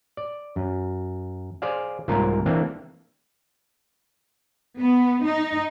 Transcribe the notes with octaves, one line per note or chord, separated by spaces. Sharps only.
D5
F#2
G#4 C5 D5 F5
C2 G#2 A#3 F4 A#4
E3 A#3 C4 D4
B3
D#4